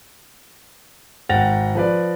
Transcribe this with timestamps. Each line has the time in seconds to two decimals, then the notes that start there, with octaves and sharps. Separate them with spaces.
1.29 G#1 F#5 G5 A6 A#6 F7
1.75 F3 B4 D5